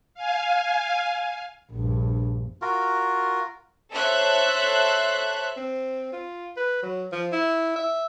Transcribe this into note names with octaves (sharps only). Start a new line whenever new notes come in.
F5 G#5
A#1 G2
F4 F#4 A#4
A4 C5 C#5 E5 F#6
C4
F4
B4
F#3
F3
E4
E5